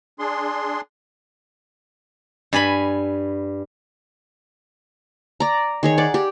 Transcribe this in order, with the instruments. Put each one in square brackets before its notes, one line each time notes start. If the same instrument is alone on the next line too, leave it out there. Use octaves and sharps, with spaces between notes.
[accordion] D4 G#4 C6
[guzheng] G2 G#5 B5
[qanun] D5 A#5
D#3 G#4 C#5
D5 F#5 D6
G4